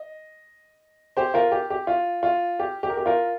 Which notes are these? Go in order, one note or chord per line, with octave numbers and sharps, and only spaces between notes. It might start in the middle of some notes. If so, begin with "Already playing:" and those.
Already playing: D#5
G4 C5
F4 A#4
G4
G4
F4
F4
G4
G4
A#4
G4
F4 A#4